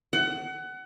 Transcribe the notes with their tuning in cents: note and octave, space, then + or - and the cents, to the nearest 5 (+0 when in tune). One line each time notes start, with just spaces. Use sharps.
F#5 +25